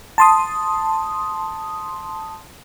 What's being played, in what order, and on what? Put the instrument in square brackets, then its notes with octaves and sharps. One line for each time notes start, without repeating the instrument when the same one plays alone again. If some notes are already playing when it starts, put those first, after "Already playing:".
[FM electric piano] A5 C6 D#6